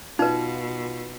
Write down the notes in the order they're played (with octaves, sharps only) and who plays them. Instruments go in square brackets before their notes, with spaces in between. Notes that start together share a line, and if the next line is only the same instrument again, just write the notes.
[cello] B2 [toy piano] D#4 B4 [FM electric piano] F4